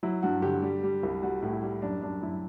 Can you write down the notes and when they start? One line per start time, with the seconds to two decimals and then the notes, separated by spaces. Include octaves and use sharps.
0.03 F#3 E4
0.22 G2 F#4
0.42 D3 G4
0.62 G3
0.83 G3
1.03 C2
1.23 G3 F#4
1.42 A2
1.53 E4
1.63 G3
1.82 F#2 D4
2.02 F#2 D4
2.23 F#2 E4